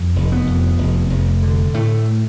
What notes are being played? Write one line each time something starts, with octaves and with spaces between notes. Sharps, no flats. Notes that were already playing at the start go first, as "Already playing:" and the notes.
Already playing: F2
F1
B3
F2
F1
F1
D3
A2 A3